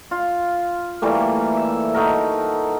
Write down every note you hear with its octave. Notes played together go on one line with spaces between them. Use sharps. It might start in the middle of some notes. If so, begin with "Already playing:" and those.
F4
E3 G3 A3 A#3
E5
D#4 F#4 A4 A#4